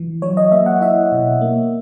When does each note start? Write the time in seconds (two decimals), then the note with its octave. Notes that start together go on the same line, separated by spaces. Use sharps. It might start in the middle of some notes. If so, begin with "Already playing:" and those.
Already playing: E3
0.22 F#3 C#5
0.37 D#5
0.52 A#3 E5
0.66 F#5
0.81 E4 E5
1.12 B2
1.41 A#3